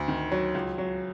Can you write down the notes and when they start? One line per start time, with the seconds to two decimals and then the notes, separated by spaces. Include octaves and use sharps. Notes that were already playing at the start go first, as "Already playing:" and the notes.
Already playing: D2
0.08 D#3
0.32 F#3
0.54 C#2
0.78 F#3